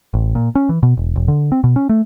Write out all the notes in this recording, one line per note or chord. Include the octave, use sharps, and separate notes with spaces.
A1
A#2
C#4
E3
B2
E1
E1
D3
C4
B2
C#4
A3